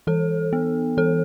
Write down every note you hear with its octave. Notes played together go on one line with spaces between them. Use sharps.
E3 A4
B3
E3 A4